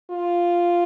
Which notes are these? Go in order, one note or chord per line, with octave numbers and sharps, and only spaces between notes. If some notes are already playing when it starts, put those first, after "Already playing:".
F4